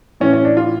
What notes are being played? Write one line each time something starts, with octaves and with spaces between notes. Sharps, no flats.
A2 E3 C#4
C#4
D4
F4